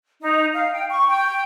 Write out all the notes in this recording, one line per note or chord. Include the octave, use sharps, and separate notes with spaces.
D#4
F5
G5
C#6
G5